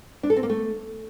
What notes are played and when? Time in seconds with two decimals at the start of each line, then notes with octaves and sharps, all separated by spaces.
0.23 D4
0.30 A4
0.36 C4
0.43 A#3
0.50 A3